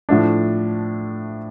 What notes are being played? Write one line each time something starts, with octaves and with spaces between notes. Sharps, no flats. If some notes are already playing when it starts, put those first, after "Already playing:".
A2 F3 A3 D4